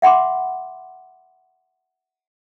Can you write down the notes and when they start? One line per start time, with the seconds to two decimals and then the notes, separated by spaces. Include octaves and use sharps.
0.02 E5 F#5 B5 C6 D6